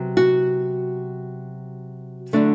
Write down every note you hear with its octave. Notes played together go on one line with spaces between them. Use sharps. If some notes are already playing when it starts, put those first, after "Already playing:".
Already playing: C3 F#3 B3
F#4
D3 F#3 A3 D4